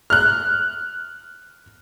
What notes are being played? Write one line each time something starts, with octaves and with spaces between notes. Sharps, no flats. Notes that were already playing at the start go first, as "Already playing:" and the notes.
F6 F#6